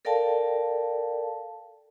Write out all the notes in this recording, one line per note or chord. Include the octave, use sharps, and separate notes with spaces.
A4 A#4 D5 F5 G5 A5